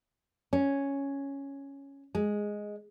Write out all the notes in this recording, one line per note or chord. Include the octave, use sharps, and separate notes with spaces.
C#4
G#3